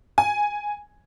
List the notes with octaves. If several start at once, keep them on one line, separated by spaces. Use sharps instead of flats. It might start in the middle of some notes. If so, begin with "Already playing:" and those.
G#5